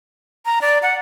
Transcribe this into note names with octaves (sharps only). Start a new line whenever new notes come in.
A#5
D5
F#5